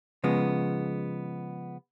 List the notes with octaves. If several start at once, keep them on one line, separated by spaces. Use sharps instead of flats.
C#3 F3 G#3 B3